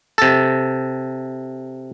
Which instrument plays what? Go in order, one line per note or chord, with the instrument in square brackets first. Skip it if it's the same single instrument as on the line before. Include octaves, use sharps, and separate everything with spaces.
[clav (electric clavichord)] C3 A4